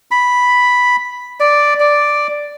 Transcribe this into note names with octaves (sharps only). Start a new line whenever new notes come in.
B5
D5
D5